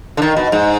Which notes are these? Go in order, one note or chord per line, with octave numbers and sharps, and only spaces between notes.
D3
D#3
B2
G#2